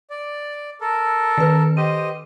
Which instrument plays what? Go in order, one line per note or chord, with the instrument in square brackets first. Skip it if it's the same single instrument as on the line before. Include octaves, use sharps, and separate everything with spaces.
[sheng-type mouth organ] D5
A4 A#4
[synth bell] D#3 B4
[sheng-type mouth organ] G4 C5 D#5 [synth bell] D#7